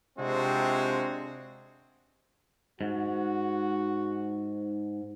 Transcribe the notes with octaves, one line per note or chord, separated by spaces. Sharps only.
C3 G#3 C4 D4 F4 F#4
G#2 F#4